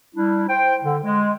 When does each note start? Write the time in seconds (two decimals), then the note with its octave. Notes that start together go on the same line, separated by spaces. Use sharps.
0.16 G3 D4 E4
0.49 C5 G5
0.84 D3
1.04 G#3